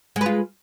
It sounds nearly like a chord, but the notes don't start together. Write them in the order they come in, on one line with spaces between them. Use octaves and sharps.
G#3 B4 F4